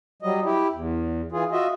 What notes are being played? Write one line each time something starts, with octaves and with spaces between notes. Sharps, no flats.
F#3 G3 D#5
E4 G4
E2
E3 F4 G#4
F4 F#4 D#5 E5